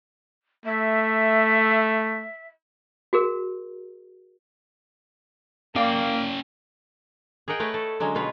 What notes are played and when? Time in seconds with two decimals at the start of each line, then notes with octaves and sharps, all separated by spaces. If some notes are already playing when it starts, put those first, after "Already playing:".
0.66 A3 E5
3.13 F#4 G#4 A#4
5.76 A#3 C#4 D5 F5 G5
7.48 G#4 A#4 D#5 F#5 G5
7.59 A3 B4 C#5 D#5 F#5 G5
7.74 A4
8.00 D3 F#3 G#3 C#4
8.15 B2 F4 B4 C#5